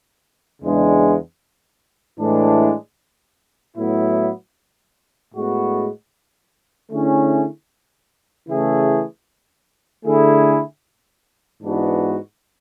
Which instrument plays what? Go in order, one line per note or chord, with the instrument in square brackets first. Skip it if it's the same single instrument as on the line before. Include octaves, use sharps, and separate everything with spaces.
[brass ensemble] E2 C#3 G#3 D4
A2 E3 G#3 D4
A2 F#3 B3 E4
A2 G#3 B3 F#4
D3 A3 C#4 E4 G#4
C#3 E3 A3 E4 G#4
D3 A3 E4 G#4
G#2 E3 B3 D4 F#4